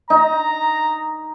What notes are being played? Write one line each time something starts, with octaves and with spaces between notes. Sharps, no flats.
D#4 A#5